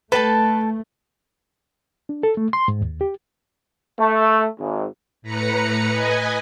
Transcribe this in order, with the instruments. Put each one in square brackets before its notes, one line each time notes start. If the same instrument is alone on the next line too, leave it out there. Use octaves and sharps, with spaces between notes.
[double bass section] A3 [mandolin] A4 G5 A5 [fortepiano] B4
[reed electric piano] D4
A4
A3
C6
G#2
D#2
G4
[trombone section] A3
G#1
[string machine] A2 B4 A#5 C#7
B4 D#5 G#5